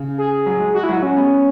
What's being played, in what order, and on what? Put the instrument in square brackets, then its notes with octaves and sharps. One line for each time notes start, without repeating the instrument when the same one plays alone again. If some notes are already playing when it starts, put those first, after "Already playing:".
Already playing: [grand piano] C#3
[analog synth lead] G#4
[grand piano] F#3
G#3
[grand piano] G#3 [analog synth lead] F#4
[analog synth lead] E4
[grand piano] F#3 [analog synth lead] F#4
[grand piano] G#3 [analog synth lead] C#4
[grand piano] B3